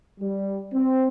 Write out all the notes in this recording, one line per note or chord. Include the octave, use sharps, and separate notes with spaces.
G3
C4